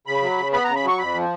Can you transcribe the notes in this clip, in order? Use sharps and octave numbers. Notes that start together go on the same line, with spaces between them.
C#3 B5
F#3
C#3
B3 B5
C#3 A#5
B5
F#3 C#6
F2 B5
F3